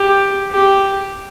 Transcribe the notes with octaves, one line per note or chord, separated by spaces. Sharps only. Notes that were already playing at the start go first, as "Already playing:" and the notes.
Already playing: G4
G4